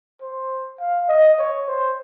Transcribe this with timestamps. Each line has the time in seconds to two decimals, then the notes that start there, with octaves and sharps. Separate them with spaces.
0.21 C5
0.80 F5
1.09 D#5
1.39 C#5
1.68 C5